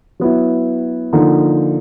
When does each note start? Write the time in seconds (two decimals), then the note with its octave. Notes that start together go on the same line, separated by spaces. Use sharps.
0.20 F#3 B3 E4
1.13 D3 F3 A#3 D#4